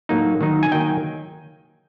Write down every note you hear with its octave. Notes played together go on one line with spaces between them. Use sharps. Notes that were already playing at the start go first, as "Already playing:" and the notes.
A2 F#3 A#3 D#4
D#3 F#3 A#3 D#4
G#5
D#3 F#3 A#3 D#4 G5